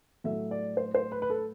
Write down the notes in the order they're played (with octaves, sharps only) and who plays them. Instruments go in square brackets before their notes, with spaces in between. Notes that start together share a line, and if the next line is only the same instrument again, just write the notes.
[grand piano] A2 F#3 A3 E5
D5
C5
C5
B4
B4
A4